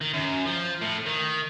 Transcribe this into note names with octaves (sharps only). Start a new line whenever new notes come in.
D#3
F#2
F3
A2
D#3